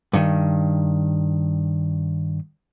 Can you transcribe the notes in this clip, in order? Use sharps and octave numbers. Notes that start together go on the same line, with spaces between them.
G2 D#3